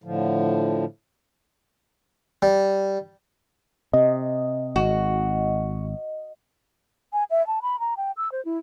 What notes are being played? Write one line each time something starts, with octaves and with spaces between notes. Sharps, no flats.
A2 D3 F3
G3
C3 D#5
G#1 F#4
G#5
E5
A5
B5
A#5
G5
E6
C5
E4